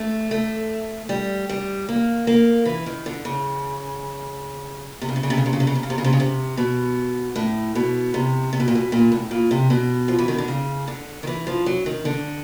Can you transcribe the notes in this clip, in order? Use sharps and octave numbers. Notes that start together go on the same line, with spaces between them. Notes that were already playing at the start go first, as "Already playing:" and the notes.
Already playing: A3
A3
G3
G3
A#3
A#3
E3
D#3
D3
C#3
C3
C#3
C3
C#3
C3
C#3
C3
C#3
C3
C#3
C3
C#3
C3
C#3
C3
C#3
C3
B2
A2
B2
C3
C3
B2
A#2
B2
A#2
A2
A#2
C3
B2
F3
E3
D#3
D3
C#3
D3
D#3
E3
F3
F#3
D#3
D3